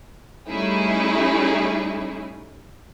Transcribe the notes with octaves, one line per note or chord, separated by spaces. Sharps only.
G3 A3 C#4 D#4 E4 G#4